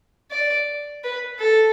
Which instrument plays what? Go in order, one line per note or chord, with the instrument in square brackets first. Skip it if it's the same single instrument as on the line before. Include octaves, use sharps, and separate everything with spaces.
[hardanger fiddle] D5
B4
A4